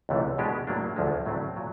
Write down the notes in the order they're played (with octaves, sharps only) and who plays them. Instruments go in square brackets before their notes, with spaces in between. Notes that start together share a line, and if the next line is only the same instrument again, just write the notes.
[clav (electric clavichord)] C#2 C3 E3 A3
B2 G#3 B3 D4 G4
A2 F#3 A#3 D4
D2 D3 F3 G#3
A2 F#3 A3 C4
A#2 F#3